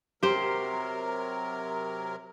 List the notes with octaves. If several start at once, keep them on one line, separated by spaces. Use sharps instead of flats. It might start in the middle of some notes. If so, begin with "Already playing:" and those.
C3 F#3 G4 A#4 C5